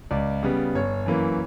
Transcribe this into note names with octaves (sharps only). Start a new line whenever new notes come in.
C#2 D5
C#3 G3 B3
G1 C#5
F#2 E3 A#3